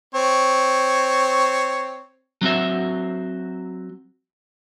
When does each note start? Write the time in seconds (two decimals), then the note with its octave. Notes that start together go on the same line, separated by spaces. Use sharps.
0.15 C4 C#5
2.41 F#3 C4 F#4 E5